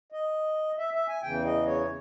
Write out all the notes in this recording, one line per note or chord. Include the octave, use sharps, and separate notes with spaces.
D#5
E5
E5
G#5
E2 C#3 E3 G5
D#5
C#5